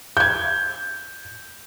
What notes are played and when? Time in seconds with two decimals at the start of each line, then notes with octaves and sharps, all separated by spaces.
0.17 G6 G#6